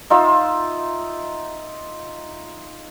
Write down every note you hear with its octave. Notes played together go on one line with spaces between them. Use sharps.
D#4 F4 E5 E6